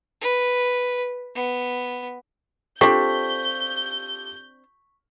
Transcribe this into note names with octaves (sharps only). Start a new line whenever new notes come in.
B4
B3
C4 D4 F4 G4 A4 C#6 G6 B6